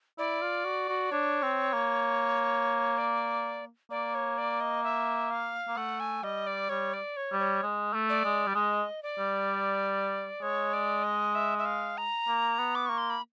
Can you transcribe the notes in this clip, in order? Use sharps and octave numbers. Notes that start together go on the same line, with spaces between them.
E4 D5
F4
F#4
F#4
D4 C#5
C4
A#3
D5
A#3 D5
C#5
D5
D#5
E5
F5
A#3
A3 F#5
G#5
G3 D#5
D5
G3 C#5
D5
C#5
G3
C#5
G#3
A3
D5
G#3
G3
G#3 D#5
D5
G3
G#3 C#5
D5
D#5
E5
E5
F5
A#5
A#3
B3
D6
A#3 C#6
C6
B5